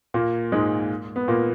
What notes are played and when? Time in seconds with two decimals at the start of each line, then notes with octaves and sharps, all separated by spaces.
0.14 A#2 A#3
0.52 G#2 G#3
1.16 B3
1.28 A#2 A#3